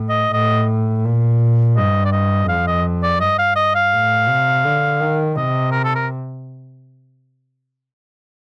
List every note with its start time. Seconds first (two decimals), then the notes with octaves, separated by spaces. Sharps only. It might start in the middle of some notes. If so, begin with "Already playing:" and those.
Already playing: A2
0.09 D#5
0.33 A2 D#5
1.05 A#2
1.76 G2 D#5
2.05 D5
2.12 D#5
2.49 F2 F5
2.67 D#5
3.03 D5
3.20 G2 D#5
3.39 F5
3.56 D#5
3.75 F5
3.92 A2
4.28 C3
4.65 D3
5.00 D#3
5.36 C3 D#5
5.72 A#4
5.84 A4
5.95 A#4